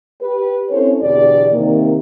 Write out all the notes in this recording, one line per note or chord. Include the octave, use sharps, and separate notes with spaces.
G4 B4
C4 C#4 E4 A4 C5 C#5
E2 B2 D3 G4 D5
C3 D#3 A#3